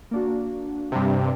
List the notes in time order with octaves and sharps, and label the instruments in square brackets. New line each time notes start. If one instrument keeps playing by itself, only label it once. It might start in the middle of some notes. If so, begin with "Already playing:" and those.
[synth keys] A#3 D4 F#4
[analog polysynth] G2 C3